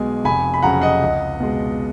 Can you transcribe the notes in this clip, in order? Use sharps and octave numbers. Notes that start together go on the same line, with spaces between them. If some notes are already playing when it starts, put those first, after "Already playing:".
Already playing: B1 B2 G#3 G#5
F1 G#5 B5
B5
F2 C#3 F#3 F#5 A#5
D#5 F#5
C#2
B2 G#3